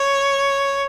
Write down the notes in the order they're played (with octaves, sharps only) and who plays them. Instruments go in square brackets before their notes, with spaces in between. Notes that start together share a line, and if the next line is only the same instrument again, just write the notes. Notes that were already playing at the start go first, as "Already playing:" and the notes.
Already playing: [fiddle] C#5